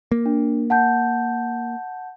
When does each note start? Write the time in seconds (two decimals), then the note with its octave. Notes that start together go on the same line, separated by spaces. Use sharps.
0.12 A#3
0.26 D4
0.70 F#5 A5 G6